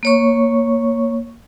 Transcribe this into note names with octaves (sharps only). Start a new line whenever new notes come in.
A#3 C#5 C#6